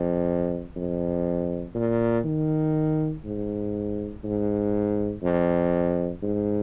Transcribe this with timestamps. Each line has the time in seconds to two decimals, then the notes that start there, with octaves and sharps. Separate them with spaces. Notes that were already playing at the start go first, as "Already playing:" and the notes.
Already playing: F2
0.76 F2
1.75 A#2
2.25 D#3
3.25 G#2
4.24 G#2
5.22 F2
6.23 G#2